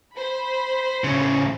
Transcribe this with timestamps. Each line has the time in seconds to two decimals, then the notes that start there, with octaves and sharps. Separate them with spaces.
0.16 C5 B5
1.04 A2 C#3